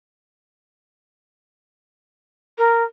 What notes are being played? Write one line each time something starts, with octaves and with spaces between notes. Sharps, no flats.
A#4